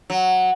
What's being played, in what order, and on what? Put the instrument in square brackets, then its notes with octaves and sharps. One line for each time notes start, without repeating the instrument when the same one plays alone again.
[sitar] F#3